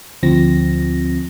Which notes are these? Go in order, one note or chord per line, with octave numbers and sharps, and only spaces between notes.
D2 F3 C4 A#6